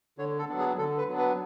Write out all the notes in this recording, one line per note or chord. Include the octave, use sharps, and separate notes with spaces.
D3 C#5
A4
F#3 B3 D4
G#4
D3 A4
B4
F#3 B3 D4
B4